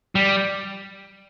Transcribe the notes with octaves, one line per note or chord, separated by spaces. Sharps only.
G3